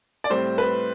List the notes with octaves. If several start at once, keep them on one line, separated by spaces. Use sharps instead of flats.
D5
A2 G3 C4 C5
B4